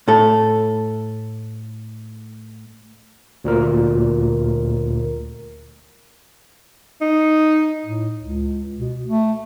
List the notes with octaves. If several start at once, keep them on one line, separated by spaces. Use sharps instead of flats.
A2 A4
D2 A#2 A#4
D#4
A2
C#2
B2
A3